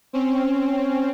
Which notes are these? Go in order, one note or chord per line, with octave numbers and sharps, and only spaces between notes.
C4 C#4